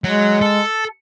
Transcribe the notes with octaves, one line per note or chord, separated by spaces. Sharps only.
F#3 G#3
A4